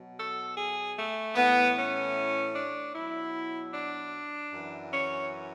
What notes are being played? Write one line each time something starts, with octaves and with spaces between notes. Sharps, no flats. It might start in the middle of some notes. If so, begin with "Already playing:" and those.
Already playing: B2 F#3
A4
G#4
A3
A2 E3 B3
C#4
D4
B2 F#3 E4
D4
F#2 E3
C#4